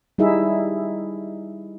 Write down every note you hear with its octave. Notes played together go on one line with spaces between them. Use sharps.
G3 D#4 E4 G#4 E5